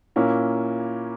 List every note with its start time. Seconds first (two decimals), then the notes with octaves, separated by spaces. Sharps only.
0.16 A#2 A#3 C#4 E4